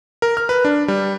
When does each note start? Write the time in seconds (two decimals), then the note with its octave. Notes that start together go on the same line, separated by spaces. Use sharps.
0.22 A#4
0.37 F6
0.49 B4
0.65 D4
0.88 G3